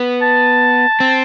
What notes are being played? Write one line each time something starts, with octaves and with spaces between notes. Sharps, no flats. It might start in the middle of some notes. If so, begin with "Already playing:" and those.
Already playing: B3
A5
C4